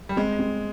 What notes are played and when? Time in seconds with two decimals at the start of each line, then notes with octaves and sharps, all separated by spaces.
0.09 G3
0.17 G#3 C4
0.39 C4